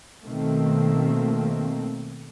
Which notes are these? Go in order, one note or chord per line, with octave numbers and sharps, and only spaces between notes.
B2 D#3 A3 A#3 C4